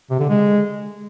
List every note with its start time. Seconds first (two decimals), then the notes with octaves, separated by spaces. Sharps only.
0.10 C3
0.20 D3
0.29 G#3